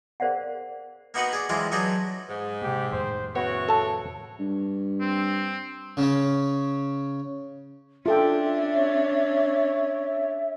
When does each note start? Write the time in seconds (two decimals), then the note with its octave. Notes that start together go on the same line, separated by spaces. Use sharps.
0.20 G#4 A#4 C5 D5 F5 F#5
1.14 A#3 B3 D#4 F#4 B4 F#5
1.33 G#4 D5
1.49 F2 E3 G#3 F4 D5
1.72 F#3 D4 D#4 G#4 B4
2.30 G#2
2.62 C3 A#3 G4
2.92 F2 A2 D#3 C5
3.35 C#3 B3 E4 F#4 C#5
3.69 A4 A5
4.39 G2
5.01 C4
5.97 C#3 C#4
8.06 C#4 D4 F4 A4 E5 G5
8.74 C#5